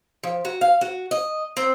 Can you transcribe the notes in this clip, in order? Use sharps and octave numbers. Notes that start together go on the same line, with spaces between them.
F3
F#4
F5
F#4
D#5
C4